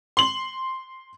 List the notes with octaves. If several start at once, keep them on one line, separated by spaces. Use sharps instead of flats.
C6 F#7